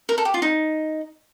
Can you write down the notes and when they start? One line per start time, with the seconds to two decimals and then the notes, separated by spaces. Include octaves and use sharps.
0.09 A#4
0.18 A4
0.25 G4
0.34 F4
0.42 D#4